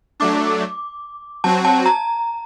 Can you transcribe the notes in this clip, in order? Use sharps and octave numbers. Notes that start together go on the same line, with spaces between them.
F#3 A3 D4 D6
F#3 C4 F#4 A5
A5
A#5